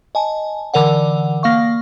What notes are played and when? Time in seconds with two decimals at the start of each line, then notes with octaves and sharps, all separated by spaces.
0.15 D#5 G#5 A5
0.74 D3 E3 A#4 D5 F#5
1.43 A#3 F5 C#6